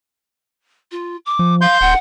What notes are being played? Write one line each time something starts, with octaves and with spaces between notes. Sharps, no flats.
F4
D6
F3
F5 C6 G6
D1 F#5